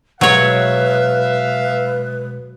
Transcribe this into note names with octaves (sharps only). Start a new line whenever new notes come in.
B2 F#3 G#3 B4 C#5 E5 F5